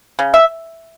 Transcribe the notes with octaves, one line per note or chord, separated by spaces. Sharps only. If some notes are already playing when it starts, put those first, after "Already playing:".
C#3
E5